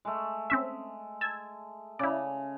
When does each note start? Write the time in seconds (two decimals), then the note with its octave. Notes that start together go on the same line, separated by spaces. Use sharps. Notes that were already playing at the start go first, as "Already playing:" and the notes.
0.05 G#3 A3
0.50 C4 C#4 E5
1.21 A5 E6 G#6
1.99 C#3 E4 D5